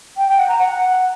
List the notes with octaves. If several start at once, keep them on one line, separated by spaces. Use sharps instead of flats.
G5
G5
F#5
A#5
F#5